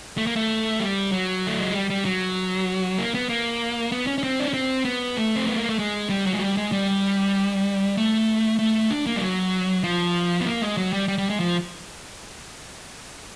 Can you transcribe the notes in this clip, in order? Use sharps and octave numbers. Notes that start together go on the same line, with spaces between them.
A3
A#3
A3
G3
F#3
A3
G#3
G3
G3
F#3
A#3
B3
A#3
B3
C#4
C#4
C4
D4
C#4
C4
B3
A3
C4
B3
A#3
A3
G#3
G3
F#3
G#3
G3
G#3
G3
A3
A3
D4
A#3
G3
F#3
F3
B3
A#3
G#3
F#3
G3
G3
G3
G#3
F3